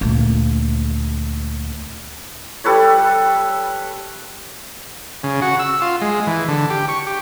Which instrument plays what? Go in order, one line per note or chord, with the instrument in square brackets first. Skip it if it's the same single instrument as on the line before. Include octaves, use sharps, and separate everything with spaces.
[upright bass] D2 A#2
[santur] G3 A4 B4 C#5
[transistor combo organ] C#3
F#4
E6
F4
G#3
E3
D3
G4
C#6
G4